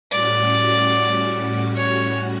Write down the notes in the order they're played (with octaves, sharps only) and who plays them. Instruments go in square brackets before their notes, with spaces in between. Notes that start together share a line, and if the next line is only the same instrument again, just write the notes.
[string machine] A2 G3 C#4 F#4 [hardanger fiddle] D5
[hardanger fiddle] C#5